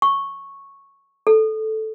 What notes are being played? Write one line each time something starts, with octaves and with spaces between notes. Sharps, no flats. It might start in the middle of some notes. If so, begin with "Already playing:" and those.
C#6
A4